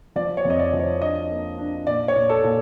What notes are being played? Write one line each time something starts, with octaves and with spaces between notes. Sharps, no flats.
F3 D5
C#5
F2
D#5
D5
F3
C#5
D4 D#5
A#3
D4
A#2 D5
C#5
A#2
A4
A#2